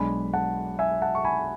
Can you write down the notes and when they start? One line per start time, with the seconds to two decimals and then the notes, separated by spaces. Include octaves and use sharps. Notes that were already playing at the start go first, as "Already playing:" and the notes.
Already playing: B1 B2 G#3 D4 G#5 B5
0.33 F#5 A5
0.79 E5 G#5
1.02 F#5 A5
1.15 C#6
1.25 G#5 B5